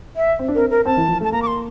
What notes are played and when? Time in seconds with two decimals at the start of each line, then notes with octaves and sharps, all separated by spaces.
0.16 E5
0.39 C4
0.48 D4
0.55 C4 A#4
0.70 A#4
0.85 C4 A5
0.97 E3
1.08 F3
1.21 A3
1.24 A5
1.32 A#3 A#5
1.42 D6
1.47 C6